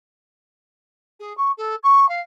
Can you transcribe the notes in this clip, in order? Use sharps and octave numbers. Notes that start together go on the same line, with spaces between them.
G#4
C#6
A4
C#6
F5